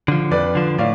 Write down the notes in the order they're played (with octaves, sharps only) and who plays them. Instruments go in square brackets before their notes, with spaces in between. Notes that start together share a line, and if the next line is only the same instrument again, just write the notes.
[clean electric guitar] D3 F3
[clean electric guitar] F2 [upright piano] B4 D5
[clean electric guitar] D3 F3
[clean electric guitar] A2 [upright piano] D5 F5